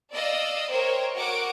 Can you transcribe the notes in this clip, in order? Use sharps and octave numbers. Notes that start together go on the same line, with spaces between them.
D5 D#5 F5 E6
A#4 C5 C#5 G5
F#4 A#4 C#5 F#5 D6 D7